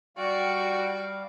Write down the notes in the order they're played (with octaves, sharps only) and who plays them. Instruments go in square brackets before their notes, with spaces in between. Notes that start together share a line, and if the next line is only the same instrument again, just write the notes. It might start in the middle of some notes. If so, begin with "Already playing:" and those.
[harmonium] G3 F5 [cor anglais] F#4 [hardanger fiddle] D5 [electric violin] G5 C#6